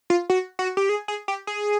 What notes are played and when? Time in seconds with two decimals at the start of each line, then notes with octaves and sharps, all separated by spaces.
0.10 F4
0.30 F#4
0.59 F#4
0.77 G4
0.89 G#4
1.08 G#4
1.28 G4
1.47 G#4